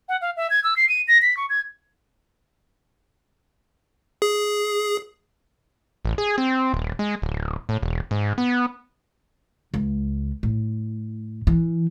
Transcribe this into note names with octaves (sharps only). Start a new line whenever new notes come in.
F#5
F5
E5
G#6
E6
C7
D#7
A#6
B6
C#6
G#6
G#4
A1
G#4
C4
D#1
G#3
D1
A2
E1
G#2
B3
C#2
A2
E3